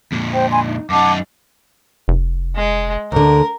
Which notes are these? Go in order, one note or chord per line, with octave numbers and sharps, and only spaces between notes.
F2 A#2
C5 G5
G#5 B5 C6
D#4
F#2 D#4 F#5 A5 D6
F1
G#3
D2 D3 A#4